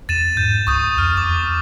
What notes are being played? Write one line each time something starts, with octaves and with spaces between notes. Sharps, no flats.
E2 A6 D#7 E7
G#2 G6
C#2 C#6 D#6 G6
F2 F6
E2 D6